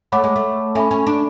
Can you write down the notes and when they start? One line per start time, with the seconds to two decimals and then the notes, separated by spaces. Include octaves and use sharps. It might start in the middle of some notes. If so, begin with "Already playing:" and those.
0.12 A3 C#5 F#5 B5 D6
0.24 G#3
0.36 A3
0.75 C#4 A4 E5 G#5 B5
0.91 C#4
1.07 D4